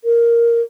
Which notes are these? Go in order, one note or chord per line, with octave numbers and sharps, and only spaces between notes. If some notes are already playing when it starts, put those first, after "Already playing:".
A#4